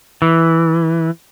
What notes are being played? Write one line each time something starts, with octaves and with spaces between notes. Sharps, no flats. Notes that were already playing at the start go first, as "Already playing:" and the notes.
E3